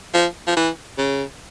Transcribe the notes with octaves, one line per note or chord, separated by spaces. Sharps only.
F3
F3
E3
C#3